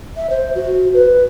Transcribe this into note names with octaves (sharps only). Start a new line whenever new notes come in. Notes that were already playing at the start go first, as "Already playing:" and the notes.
E5
C5
F#4
B4